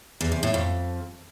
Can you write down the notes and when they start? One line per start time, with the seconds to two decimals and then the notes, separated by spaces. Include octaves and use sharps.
0.21 E2
0.32 C3
0.43 A2
0.54 F2